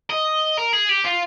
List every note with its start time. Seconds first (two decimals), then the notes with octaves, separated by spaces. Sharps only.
0.10 D#5
0.58 A#4
0.73 G#4
0.89 G4
1.05 F4